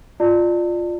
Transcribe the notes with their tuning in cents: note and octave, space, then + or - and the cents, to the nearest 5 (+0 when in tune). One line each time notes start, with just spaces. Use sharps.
F4 +0 D5 +20 A5 +45